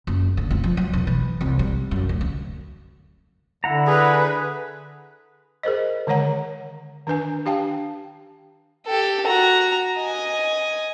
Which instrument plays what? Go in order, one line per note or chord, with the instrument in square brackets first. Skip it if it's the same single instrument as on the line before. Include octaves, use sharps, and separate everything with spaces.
[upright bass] F#1
D3
F1
F3
F#3
E1
E3
C2
G3
F#2
D2
D3
[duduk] D3 [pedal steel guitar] E4 F#5 A#5
[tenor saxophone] G#4 [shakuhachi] B4
[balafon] G#4 A#4 C5 D#5
D3 D#3 G#3 C#5 F#5 A#5
D#3 D4 B4 G#5
D4 G4 F5 G5 A5
[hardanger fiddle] G4 A4
F#4 A#5
D#5 G#5